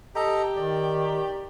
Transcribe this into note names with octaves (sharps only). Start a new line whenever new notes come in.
G4 A4 D#5 A#5
D#3 D5